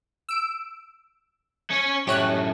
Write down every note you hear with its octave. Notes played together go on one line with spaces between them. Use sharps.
E6 D7
C#4 C#5
F#2 A2 G4 C#5 F#6